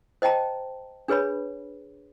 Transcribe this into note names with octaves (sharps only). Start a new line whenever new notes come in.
C5 D#5 G5 A5 A#5
D4 G#4 B4 C#5 B5